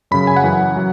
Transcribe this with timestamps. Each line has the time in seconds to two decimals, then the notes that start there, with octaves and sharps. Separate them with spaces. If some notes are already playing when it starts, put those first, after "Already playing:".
0.11 F#2 C#3 F#3 B5
0.27 G#5
0.36 F#5
0.44 F#2 E3
0.77 F#3